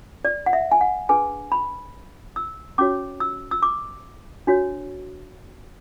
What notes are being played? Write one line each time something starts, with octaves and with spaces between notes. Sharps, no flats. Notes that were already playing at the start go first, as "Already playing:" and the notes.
D5
F#5
E5
G#5
F#5
D4 G#4 B4 G#5
B5
E6
C#4 F#4 C#5 D6
E6
E6
D6
D4 F#4 C#5